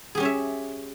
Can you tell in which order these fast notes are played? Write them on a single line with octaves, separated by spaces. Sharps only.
G#4 G4 C#4 C#5 E5